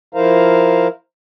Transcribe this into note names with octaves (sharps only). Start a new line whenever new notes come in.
F3 E4 A#4 C5 F5 A#5